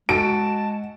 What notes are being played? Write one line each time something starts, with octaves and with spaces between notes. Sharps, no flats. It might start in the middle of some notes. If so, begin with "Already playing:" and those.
G#3 F#4 A5 D7